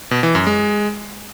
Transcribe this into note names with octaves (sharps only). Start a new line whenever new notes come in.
B2
E3
F#2
G#3